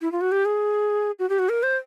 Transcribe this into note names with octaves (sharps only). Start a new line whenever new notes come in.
E4
F4
F#4
G4
G#4
F#4
G4
F#4
A#4
C5